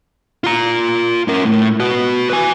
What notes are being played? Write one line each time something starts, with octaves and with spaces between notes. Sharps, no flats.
F4 A#5
C#4 A#4
A2
F#4 B4
B4 G#5